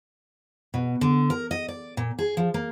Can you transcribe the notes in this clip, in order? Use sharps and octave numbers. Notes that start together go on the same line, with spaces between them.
B2
D3
A#4
D#5
D5
A#2
G#4
F3
A#3